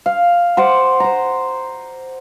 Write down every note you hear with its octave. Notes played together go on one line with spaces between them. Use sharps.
F5
C5 F#5 D6
C5 A#5